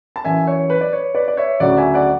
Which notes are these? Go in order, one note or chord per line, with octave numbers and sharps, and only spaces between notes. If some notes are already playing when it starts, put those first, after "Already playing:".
A5
F#2 E3 E5 G#5
C#5
B4
D5
C#5
B4 D5
D5
C#5 E5
D2 C#3 F#3 D5 F#5
E5 G#5
D5 F#5